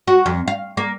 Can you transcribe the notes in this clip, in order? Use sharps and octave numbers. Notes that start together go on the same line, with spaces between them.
F#4
F2
F5
A#3